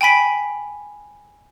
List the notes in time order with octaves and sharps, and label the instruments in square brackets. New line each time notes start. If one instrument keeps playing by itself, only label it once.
[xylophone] G5 G#5 B5 B6 D7